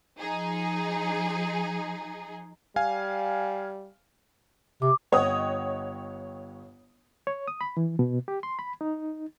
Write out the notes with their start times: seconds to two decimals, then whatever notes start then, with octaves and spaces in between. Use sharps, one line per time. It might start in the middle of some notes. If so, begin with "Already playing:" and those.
0.20 F3 D#4 G#4
2.76 G3 F5 G#5
4.82 C3 D6
5.12 G1 C#5 D#5 F#5 G5 D#6
7.27 C#5
7.48 D#6
7.61 B5
7.77 E3
7.99 B2
8.28 G4
8.43 C6
8.59 B5
8.81 D#4